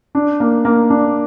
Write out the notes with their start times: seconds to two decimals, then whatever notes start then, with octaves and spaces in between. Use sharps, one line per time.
0.15 D4
0.40 A#3
0.65 A#3
0.90 D4